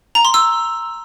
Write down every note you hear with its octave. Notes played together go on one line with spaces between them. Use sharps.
A#5
C6
E6